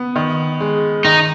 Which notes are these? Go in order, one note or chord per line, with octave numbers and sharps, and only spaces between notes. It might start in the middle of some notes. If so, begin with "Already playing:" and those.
Already playing: B3
D#3
G#3
D#3 D#4